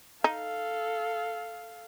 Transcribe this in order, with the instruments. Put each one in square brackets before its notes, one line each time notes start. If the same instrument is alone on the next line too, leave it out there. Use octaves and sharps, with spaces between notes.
[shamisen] D#4 [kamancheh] A4 F5